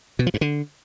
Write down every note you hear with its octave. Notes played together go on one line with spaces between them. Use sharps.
B2
F3
G2
D3